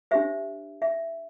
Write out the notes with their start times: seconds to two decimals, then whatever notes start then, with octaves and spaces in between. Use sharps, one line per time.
0.11 D4 G4 C5 E5
0.82 E5